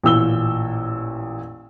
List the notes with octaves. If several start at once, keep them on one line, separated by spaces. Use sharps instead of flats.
A1 A#2 E6 G7